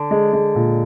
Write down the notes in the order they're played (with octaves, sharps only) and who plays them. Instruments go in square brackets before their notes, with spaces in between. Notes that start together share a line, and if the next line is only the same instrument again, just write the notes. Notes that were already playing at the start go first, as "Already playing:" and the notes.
Already playing: [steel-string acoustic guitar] D3
[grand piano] G#3
G#3
A#2